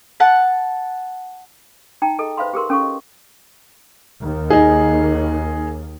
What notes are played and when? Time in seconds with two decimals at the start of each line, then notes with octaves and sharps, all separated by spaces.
0.20 F#5 A5
2.02 D#4 G5 A#5
2.19 G#4 A4 D#5
2.37 B4 C5 E5 F5 B5 C6
2.54 G4 G#4 A#4 C6
2.70 C#4 A4 F5 C#6
2.81 D#5
4.22 D#2
4.50 D#4 G#4